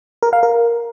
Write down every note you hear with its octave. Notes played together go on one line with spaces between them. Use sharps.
A#4
F5
A#4